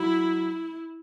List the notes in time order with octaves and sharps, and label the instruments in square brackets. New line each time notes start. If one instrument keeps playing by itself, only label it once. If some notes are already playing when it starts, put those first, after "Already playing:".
Already playing: [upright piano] F#3 [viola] E4